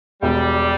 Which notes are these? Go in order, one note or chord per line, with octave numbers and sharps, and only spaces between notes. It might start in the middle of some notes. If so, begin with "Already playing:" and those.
E1 G3